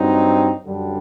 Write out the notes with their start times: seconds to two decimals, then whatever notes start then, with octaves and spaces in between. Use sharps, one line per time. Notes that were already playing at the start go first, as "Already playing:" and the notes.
Already playing: G2 F#3 C4 D#4
0.66 F#2 D3 G3 D4